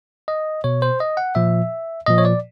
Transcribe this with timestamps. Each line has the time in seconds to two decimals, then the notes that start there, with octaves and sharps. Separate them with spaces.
0.28 D#5
0.64 B2 C#5
0.82 C5
1.00 D#5
1.17 F#5
1.35 A#2 F3 E5
2.07 A#2 F3 D#5
2.18 C#5
2.25 D5